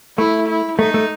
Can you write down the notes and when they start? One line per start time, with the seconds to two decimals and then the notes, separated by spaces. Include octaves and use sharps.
0.18 A3 E4
0.48 E4
0.79 A3 D#4
0.94 A3